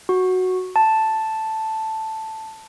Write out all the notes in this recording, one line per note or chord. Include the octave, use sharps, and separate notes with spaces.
F#4
A5